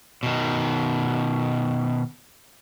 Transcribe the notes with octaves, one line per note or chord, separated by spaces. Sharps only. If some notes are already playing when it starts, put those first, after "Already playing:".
B2 D#3